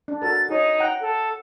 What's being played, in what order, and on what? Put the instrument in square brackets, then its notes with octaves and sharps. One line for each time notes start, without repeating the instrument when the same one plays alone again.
[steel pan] D4
[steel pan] F#4 A4 A#4 [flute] A6
[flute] D#4 [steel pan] G#4 C#5
[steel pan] F#5 G5 A#5
[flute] A4